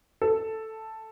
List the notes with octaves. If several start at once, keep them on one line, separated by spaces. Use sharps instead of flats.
A4